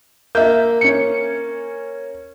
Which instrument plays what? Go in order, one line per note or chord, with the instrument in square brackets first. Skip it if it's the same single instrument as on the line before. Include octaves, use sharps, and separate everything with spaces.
[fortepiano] A#3 [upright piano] E5 G6
[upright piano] C#4 C#7